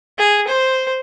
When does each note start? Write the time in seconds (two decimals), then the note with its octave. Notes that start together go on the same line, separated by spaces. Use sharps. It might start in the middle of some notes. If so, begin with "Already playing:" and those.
0.18 G#4
0.48 C5